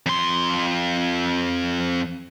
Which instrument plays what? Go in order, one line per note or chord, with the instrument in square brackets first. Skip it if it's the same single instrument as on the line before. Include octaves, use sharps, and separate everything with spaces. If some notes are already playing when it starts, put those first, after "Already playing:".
[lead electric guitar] F2 C6